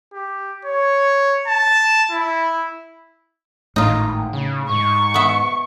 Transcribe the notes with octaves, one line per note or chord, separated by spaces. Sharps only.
G4
C#5
A5
E4
G#1 A2 D#4 F4
C#3
G#2 C#6
B3 E5